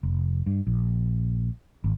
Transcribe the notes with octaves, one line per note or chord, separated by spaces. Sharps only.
F1
G2
A#1
G#1